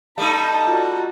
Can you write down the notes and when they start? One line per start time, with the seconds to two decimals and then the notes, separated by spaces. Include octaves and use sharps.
0.18 G3 A3 D#4 F5 A5 B5 D#6
0.68 F4 F#4 D5